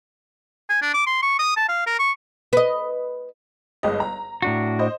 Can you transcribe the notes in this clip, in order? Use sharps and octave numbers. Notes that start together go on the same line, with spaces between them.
G#5
D4
D6
C6
C#6
D#6
A5
F5
A#4
C#6
B4 D#5
G1 G#3 D#5
A#5
A2 D4 F#4
C5 D#5